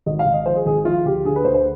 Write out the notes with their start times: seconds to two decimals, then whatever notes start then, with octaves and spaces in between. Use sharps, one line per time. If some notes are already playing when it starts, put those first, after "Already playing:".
0.06 G#1 D#5
0.19 F5
0.26 G#1
0.33 D#5
0.46 F3 C5
0.56 G#4
0.66 G#1 G#4
0.85 F3 F4
1.05 D2 G4
1.25 D3 G#4
1.36 B4
1.44 D2 C5
1.54 C5